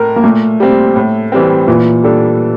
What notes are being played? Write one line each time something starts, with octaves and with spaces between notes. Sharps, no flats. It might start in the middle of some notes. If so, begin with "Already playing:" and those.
Already playing: A2 A#4
A#3
A#2 A3
G3 C4
A2
E3 G3 C4
A#2 E3
G3 D4 A4